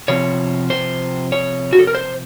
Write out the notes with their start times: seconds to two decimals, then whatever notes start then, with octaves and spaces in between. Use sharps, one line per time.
0.08 C3 F3 C4 C#5
0.70 C5
1.32 C#5
1.73 F#4
1.79 A4
1.87 A#4
1.95 C5